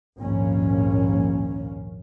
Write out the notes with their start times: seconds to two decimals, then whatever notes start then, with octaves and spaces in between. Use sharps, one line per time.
0.19 A#1 D#2 G#2 A#3 C#4